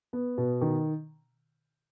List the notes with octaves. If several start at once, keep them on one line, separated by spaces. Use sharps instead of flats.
B3
B2
D#3